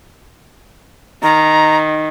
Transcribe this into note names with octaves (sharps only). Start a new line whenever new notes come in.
D#3 A#5